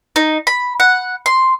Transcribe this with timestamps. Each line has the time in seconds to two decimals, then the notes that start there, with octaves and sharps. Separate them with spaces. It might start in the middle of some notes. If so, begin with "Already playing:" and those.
0.16 D#4
0.47 B5
0.80 F#5
1.26 C6